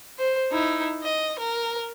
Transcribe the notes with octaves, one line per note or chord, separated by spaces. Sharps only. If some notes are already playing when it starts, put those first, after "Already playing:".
C5
D#4 E4
D#5
A#4